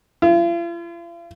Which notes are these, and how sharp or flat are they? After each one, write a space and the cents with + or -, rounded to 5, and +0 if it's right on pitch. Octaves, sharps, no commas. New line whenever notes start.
F4 -45